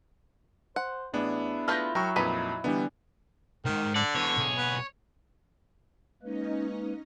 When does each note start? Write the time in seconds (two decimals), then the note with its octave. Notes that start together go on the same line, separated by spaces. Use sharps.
0.76 C5 F#5
1.13 A1 B3 D4 E4 G#4
1.68 A3 F4 B4 F6 G6 A#6
1.95 F#3 A#4 G5 C#6
2.16 F2 A#2 D#4 B4 B5
2.64 D3 E3 G3 B3
3.65 C2 G#2 D#3
3.96 D3 D5
4.15 B2 E3 C#5
4.37 B1 G#4
4.58 B3
6.23 G#3 A#3 C#4 D#4 B4 D#5